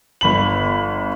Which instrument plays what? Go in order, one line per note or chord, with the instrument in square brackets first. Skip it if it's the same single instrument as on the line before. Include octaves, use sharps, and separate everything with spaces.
[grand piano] G1 B5 F#7